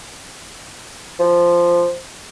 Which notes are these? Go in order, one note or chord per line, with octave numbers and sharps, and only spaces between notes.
F3